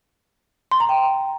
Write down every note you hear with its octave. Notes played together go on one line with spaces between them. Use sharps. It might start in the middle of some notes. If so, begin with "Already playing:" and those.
C6
A#5
G5